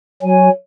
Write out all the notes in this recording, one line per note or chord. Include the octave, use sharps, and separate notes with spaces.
F#3 F#4 C#5 G#5